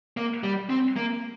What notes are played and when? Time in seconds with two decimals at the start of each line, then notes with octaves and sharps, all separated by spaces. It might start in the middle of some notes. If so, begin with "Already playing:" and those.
0.17 A#3
0.44 G3
0.70 C4
0.96 A#3